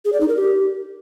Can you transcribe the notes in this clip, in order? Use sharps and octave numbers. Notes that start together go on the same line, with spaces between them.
G#4
D5
D#4
A#4
G4